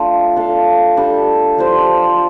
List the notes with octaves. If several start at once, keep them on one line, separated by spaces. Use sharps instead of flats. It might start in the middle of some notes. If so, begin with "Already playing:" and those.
Already playing: A3 D4 F4 A4 F5
D4 A4 F5
G3 D4 A4
F3 D4 G4 C5